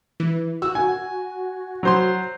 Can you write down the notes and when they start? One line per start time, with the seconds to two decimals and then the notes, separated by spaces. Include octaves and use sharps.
0.20 E3
0.62 F#4 E6
0.75 G#5
1.83 F#3 C5 C6